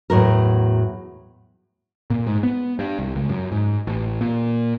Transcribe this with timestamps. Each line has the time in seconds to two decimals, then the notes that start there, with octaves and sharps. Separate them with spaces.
0.10 E2 A2 F#3 A#4
2.10 A#2
2.27 G#2
2.43 B3
2.79 G2
2.99 C2
3.15 C#2
3.29 F#2
3.52 G#2
3.87 A1
4.21 A#2